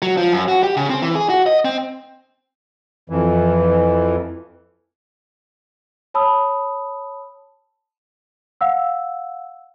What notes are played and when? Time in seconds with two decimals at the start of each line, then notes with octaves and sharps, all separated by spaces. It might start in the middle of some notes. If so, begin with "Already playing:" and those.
0.02 F#3
0.17 F3
0.33 F#2
0.48 F#4
0.63 G4
0.77 C#3
0.90 C4
1.02 E3
1.15 G#4
1.29 F#4
1.46 D#5
1.65 C4
3.10 F2 E3
6.14 C#5 A5 B5 D#6 E6
8.61 F5 F#5 E6